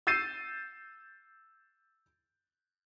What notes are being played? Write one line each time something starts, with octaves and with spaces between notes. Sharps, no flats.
E6 G6 A6 C7 D#7 E7